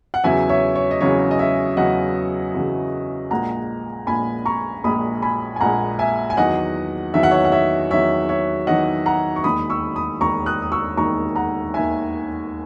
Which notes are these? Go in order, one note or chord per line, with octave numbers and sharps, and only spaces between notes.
F#5
E2 C#3 F#3 E5 G#5
C#5 E5
C#5
D#5
E2 C#3 F#3 C#5
D#5
C#5 E5
E2 C#3 F#3 D#5 F#5
E2 C#3 F#3
A#1 A#2 G#3 F#5 A#5
A#1 A#2 G#3 G#5 B5
A#5 C#6
A#1 A#2 G#3 B5 D#6
G#5 B5
G#5
A#1 A#2 G#3 F#5 A#5
E5 G#5
G#5
E2 D#3 F#3 D#5 F#5
E2 D#3 F#3 E5
F#5
C#5 E5
F#5
C#5 E5
E2 D#3 F#3 C#5 E5
C#5 E5
E2 D#3 F#3 D#5 F#5
F#5 A#5
C#6
E1 D#2 D#3 B5 D#6
C#6 E6
B5 D#6
E1 D#2 D#3 A#5 C#6
D#6 F#6
D#6
C#6 E6
E1 D#2 D#3 A#5 C#6
F#5 A#5
E1 D#2 D#3 E5 G#5